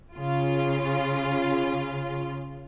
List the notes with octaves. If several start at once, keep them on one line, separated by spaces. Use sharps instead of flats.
C#3 F4